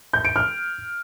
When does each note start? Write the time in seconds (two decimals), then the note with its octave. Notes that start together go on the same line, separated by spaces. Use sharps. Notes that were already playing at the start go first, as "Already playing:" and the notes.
0.13 G6
0.25 D7
0.36 F6